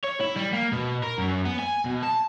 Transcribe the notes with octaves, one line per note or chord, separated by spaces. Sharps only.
C#5
E4
G3
A#3
B2
A#4
F#2
B3
G#5
B2
A5